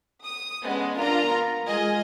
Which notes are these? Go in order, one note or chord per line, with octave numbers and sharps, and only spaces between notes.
D#6
G#3 B3 C#4 D4
D4 F4 A#4 A#5
B3
G#3 F4 G#4 D#5